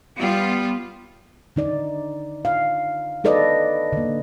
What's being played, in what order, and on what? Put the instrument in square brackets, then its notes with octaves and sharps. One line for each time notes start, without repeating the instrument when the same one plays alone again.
[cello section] G3 B3 F4
[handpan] D3 D#4 D5
F5
D#4 A4 B4 D5 D#5
D3 A#3